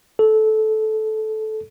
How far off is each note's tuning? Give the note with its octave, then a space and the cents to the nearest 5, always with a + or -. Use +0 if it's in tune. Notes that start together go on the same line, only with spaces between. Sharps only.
A4 -15